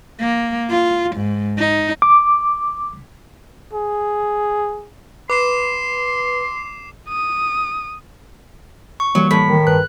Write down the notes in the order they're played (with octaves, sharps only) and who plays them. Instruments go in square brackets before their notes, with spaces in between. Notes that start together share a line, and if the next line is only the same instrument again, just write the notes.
[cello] A#3
F4
G#2
D#4
[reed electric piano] D6
[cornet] G#4
[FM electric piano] B4 [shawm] C6 [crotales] D6 C7 E7
[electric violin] D#6
[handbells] C#6
[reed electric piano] E3 G3 A#3 [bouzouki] F#3
[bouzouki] A2 [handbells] B6
[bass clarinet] D#3
[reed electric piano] G2 B4 [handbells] F#6